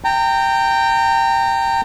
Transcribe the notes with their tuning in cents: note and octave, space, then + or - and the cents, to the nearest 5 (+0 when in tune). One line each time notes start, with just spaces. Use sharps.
G5 +0 A#5 -30